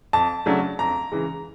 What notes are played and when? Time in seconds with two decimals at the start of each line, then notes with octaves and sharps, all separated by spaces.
0.13 F2 A5
0.46 C#3 F#3 A3 D4
0.79 F2 A#5
1.12 C#3 E3 G#3